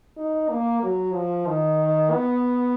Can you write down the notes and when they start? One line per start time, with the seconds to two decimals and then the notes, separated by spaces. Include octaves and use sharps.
0.17 D#4
0.50 A#3
0.83 F#3
1.14 F3
1.47 D#3
2.11 B3